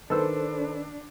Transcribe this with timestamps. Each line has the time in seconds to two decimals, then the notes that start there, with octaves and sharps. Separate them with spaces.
0.10 D#3 D4 A4 B4 C5 E6